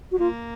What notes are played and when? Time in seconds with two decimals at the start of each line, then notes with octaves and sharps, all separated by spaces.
0.12 F#4
0.19 A#3 F4